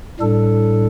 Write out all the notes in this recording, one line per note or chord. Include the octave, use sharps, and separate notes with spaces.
A2 G3 D4 A4